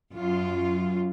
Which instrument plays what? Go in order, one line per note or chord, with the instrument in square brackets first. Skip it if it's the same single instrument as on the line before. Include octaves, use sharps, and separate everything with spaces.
[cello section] F#2 F4